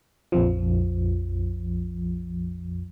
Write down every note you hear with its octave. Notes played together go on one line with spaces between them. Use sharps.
A#1 F2 F3